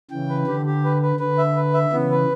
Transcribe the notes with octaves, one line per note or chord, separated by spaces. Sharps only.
C#3 E3 G5
B4
D3 G4
G4
B4
B4
D3 B4
E5
B4
E5
C#3 E3 B3
B4